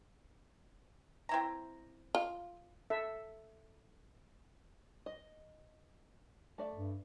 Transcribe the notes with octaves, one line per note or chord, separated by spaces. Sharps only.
C4 E4 A#5
F4
A4 E5
D#5
A3 D5 E5
G2